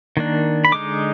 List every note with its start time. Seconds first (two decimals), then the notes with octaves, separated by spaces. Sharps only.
0.17 D#3 A#3 D4
0.65 B5
0.72 D3 G#3 D#4 D6